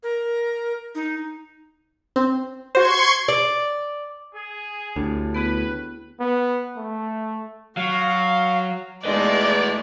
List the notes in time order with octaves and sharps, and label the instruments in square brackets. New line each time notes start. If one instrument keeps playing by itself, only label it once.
[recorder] A#4
D#4
[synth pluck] C4
[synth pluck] F#4 C5 [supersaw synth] C6 C#6 G#6
[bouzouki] D5
[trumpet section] G#4
[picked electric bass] D2 [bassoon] A2 [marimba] D4 G4
[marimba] B3 E4 G#4 [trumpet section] B4
[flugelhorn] B3
A3
[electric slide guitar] F#3 [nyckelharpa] F#4 [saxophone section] F5
[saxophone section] E2 E3 D#4 [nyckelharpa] G#3 A3 [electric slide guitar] B4 D#5 [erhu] D5